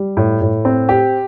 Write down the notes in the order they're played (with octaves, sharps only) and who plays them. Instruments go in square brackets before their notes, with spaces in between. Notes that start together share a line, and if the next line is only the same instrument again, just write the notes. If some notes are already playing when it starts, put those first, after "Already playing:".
Already playing: [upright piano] G3
A2
A2
C4
G4